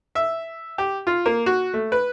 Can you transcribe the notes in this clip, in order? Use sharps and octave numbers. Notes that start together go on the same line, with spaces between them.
E5
G4
F4
A#3
F#4
A3
B4